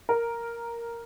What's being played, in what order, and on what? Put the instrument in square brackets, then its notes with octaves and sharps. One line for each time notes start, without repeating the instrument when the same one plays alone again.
[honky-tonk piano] A#4